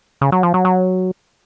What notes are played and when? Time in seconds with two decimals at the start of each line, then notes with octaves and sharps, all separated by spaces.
0.21 C#3
0.32 F#3
0.43 F3
0.54 F#3
0.65 F#3